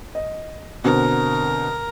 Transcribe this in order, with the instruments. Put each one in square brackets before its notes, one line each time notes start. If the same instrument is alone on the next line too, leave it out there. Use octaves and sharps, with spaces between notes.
[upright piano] D#5
[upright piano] B2 D3 C4 [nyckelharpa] A#4